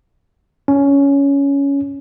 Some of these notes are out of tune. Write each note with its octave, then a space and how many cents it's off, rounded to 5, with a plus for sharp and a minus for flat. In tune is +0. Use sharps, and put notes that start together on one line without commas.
C#4 +10